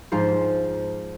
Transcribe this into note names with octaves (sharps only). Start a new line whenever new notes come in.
G#2 F3 C5